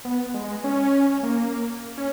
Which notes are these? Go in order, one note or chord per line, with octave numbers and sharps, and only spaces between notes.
B3
G#3
C#4
A#3
C#4